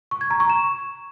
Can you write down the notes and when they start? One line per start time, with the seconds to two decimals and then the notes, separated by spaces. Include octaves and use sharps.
0.11 C#6
0.21 G#6
0.30 A#5
0.40 C#6
0.50 E7